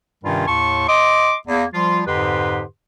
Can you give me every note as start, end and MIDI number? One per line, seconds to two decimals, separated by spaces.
0.24 0.44 43
0.24 0.44 48
0.24 0.44 51
0.24 0.44 55
0.24 0.44 61
0.24 0.44 65
0.48 0.87 39
0.48 0.87 45
0.48 0.87 81
0.48 0.87 84
0.48 0.87 85
0.89 1.35 75
0.89 1.35 84
0.89 1.35 86
1.47 1.64 40
1.47 1.64 58
1.74 2.03 53
1.74 2.03 55
1.74 2.03 65
2.07 2.63 41
2.07 2.63 44
2.07 2.63 50
2.07 2.63 67
2.07 2.63 71
2.07 2.63 84